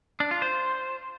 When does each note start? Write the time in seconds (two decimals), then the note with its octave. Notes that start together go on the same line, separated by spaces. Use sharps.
0.20 D4
0.31 F4
0.42 C5